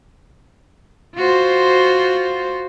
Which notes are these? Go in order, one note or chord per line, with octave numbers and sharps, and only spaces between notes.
F4 F#4 C5